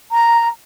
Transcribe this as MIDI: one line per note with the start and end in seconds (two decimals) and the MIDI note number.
0.12 0.48 82